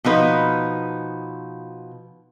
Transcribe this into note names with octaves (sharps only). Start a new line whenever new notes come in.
B2 F3 D#4 B4